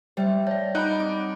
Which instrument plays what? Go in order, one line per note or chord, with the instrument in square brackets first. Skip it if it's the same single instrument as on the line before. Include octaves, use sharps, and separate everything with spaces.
[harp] G3 [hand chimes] C5 E5 G5
[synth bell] C#5 D5 [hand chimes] A5 G6
[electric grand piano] D#4 F#6 [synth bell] F#5 B5 D7
[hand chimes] C4 D6